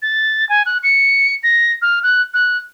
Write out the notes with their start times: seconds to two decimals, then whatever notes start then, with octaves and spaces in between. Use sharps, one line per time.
0.02 A6
0.49 G#5
0.66 F#6
0.83 C#7
1.43 A#6
1.82 F6
2.03 F#6
2.34 F#6